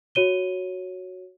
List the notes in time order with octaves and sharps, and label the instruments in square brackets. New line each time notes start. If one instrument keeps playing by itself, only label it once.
[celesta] F#4 C#5 D#7 G7